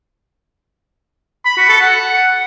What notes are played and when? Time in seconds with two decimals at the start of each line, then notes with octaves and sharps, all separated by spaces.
1.45 B5
1.57 F#4
1.69 A4
1.81 F#5